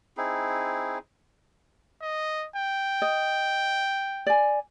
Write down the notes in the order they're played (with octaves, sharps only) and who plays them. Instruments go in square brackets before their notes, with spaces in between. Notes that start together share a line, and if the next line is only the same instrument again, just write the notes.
[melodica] C4 D#4 E4 G#4
[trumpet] D#5
G5
[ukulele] D#5
D5 G#5